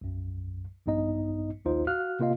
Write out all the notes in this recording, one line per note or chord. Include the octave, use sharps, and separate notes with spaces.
B1 F#2
A#1 G2 B3 D#4 D#5
A#1 D#2 D#4 F4 C5
F#4 F5 F6 F#6
C3 A#3 F4 D#5 F5